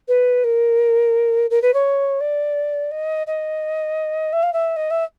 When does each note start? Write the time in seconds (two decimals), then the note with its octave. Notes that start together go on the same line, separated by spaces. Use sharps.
0.08 B4
0.44 A#4
1.50 A#4
1.62 B4
1.73 C#5
2.20 D5
2.91 D#5
3.27 D#5
4.32 E5
4.43 F5
4.53 E5
4.76 D#5
4.90 E5